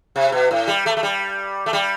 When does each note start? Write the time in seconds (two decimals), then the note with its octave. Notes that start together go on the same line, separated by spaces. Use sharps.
0.16 C3
0.32 B2
0.51 A2
0.67 G3
0.86 A3
0.97 A3
1.03 G3
1.66 A3
1.73 G3